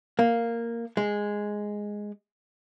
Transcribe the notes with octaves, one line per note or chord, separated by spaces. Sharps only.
A#3
G#3